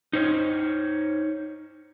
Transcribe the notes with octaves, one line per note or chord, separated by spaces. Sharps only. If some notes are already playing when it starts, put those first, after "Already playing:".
D#4 C5 C#5